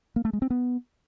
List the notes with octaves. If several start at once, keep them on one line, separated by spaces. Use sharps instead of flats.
A#3
A3
G#3
C4
B3